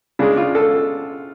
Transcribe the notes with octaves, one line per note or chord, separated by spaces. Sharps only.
C#3 G#3 D4
F4
A4